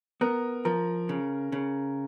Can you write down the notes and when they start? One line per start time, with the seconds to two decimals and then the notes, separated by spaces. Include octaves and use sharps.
0.21 B3 A#4
0.65 F3 A#4
1.09 C#3
1.52 C#3